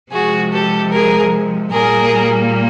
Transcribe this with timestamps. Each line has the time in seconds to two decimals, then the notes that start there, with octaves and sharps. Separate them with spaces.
0.11 C3 F3 G#3 F#4 G#4
0.51 G4 A4
0.92 G#4 A#4
1.71 A#2 G3 A#3 G#4 A#4